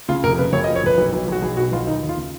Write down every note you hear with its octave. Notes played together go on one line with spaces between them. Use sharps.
C#3 F4
F1 A#4
C#3 B4
F#1 C#5
D#5
F3
C#5
F#1 B4
B1
B1
B1 F#4
B1 G#4
B2 F#4
B1 F4
D#2 D#4
D#2
F4
C#3